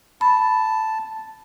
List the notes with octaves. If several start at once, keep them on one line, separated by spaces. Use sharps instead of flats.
A5 B5